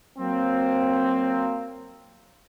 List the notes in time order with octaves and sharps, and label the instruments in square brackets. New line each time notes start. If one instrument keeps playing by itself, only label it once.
[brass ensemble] F#3 A#3 C4